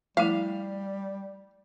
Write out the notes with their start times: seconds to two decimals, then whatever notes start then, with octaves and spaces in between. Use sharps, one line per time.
0.17 F3 G3 A3 E4 F5